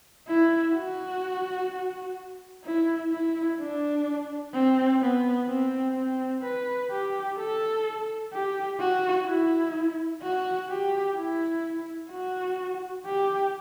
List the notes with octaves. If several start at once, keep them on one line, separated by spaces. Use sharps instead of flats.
E4
F#4
E4
E4
D4
C4
B3
C4
C4
B4
G4
A4
G4
F#4
E4
F#4
G4
E4
F#4
G4